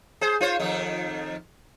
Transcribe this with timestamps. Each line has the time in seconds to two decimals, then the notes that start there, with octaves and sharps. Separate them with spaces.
0.21 G#4 C5
0.41 F4 C5 C#5
0.59 F2 D#3 D#4